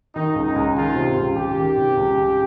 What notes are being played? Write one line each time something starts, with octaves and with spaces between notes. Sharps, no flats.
D#3 D#4
C#2
D#4
C#2
D#3 F4
C3
C#2
C#2 G4
D#3
C3
C#2
C#2